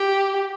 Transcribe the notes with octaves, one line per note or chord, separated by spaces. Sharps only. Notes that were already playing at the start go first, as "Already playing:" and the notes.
Already playing: G4